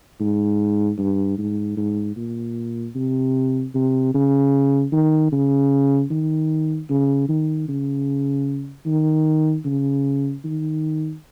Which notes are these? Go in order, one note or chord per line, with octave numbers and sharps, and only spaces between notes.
G#2
G2
G#2
G#2
A#2
C3
C3
C#3
D#3
C#3
D#3
C#3
D#3
C#3
D#3
C#3
D#3